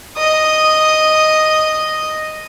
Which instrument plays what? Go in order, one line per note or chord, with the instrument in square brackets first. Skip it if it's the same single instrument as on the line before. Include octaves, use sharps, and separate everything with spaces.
[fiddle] D#5 D#6